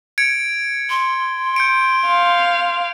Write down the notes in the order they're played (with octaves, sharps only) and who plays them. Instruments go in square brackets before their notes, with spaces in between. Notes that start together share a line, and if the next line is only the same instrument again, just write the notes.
[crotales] G#6 C#7 D7
[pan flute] C6
[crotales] G6 C#7 D7
[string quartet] F5